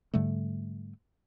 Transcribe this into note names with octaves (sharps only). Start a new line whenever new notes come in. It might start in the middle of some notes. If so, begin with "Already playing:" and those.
G#2 D3 G3 A3